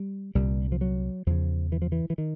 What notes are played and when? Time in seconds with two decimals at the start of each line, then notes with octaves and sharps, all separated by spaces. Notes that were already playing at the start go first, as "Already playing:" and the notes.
Already playing: G3
0.35 C2 A#2 G3
0.72 F3
0.81 F#3
1.26 E2 C#3 F3
1.72 E3
1.82 F3
1.92 E3
2.10 E3
2.18 D#3